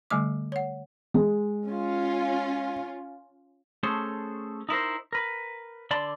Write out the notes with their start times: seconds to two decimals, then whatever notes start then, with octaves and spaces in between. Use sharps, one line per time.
0.11 D3 G3 A3 D6
0.52 C#5 F#5
1.14 G#3
1.68 C#4 F4
3.83 A3 C#4 G#4 A4 C5
4.69 D#4 E4 A#4 C5
5.13 A#4 B4
5.91 D3 D5 A5 B5 C6